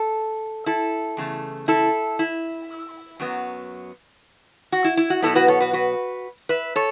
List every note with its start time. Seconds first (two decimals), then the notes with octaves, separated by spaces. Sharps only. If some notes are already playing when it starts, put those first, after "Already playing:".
Already playing: A4
0.66 E4 A4
1.17 E2 C#3 A3
1.68 E4 A4
2.19 E4
3.20 F#2 F#3 B3
4.72 F#4
4.84 E4
4.97 E4
5.10 F#4
5.22 B2 F#3 B3 E4 A4
5.35 F#4 B4
5.48 A4 C#5
5.60 F#4 B4
5.73 F#4 B4
6.49 B4 E5
6.76 A4 C#5